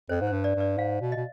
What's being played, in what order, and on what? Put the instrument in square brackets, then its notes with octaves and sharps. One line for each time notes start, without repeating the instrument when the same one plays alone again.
[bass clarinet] F2 [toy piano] C5
[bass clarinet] G#2
[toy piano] C5
[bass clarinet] G2
[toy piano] D5
[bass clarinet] G2 [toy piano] D5
[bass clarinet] G#2 [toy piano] F5
[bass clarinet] B2
[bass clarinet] B2 [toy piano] D#5